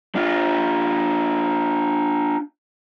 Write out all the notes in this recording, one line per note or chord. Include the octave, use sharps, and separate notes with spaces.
D4 F4